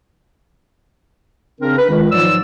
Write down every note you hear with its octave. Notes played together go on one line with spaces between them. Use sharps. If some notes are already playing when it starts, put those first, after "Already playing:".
C#3 C4 D4 A#4
B4
C#2 D#3
G#2 F3 F#3 F4 D5 E6